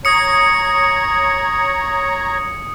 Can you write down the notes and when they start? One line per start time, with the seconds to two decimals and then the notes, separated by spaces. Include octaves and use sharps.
0.05 C#5 A#5 D#6 C#7